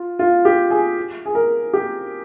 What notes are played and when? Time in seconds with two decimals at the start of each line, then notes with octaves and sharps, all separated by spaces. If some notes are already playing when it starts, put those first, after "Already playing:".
Already playing: F4
0.19 F4
0.45 G4
0.70 G#4
1.26 G#4
1.35 A#4
1.73 G4